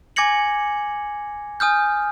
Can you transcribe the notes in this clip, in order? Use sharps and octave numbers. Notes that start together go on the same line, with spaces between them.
G#5 D6 G#6 A#6 C#7 F#7
G#5 D#6 F6 G6